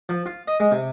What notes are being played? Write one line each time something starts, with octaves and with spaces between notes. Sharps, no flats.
F3
F4
D#5
G#3
C3